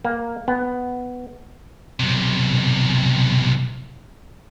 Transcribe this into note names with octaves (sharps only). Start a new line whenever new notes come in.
A#3
B3
B1 C3